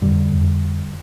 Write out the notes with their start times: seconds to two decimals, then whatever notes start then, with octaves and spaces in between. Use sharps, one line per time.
0.02 F2 D3 G3
0.32 F2